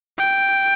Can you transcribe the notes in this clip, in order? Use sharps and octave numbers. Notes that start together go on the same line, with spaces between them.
G5